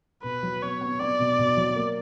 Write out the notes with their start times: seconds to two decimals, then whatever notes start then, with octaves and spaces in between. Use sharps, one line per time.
0.24 B2 B4
0.43 F#3
0.62 B3 C#5
0.81 B3
1.00 B3 D5
1.20 B2
1.39 B2
1.57 F#3
1.76 A#3